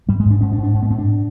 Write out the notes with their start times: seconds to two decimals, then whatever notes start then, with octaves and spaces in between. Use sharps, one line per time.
0.08 G#2 G3
0.20 G#3
0.25 G#2
0.30 D4
0.41 G#2 C#4
0.52 D4
0.58 G#2
0.63 D4
0.74 G#2
0.82 B3
0.90 G#2 C4
0.98 D4